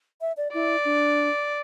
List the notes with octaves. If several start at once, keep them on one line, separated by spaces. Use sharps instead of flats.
E5
D5
E4 D5
D4